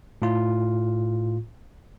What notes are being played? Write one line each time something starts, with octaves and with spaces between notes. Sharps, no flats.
A2 F4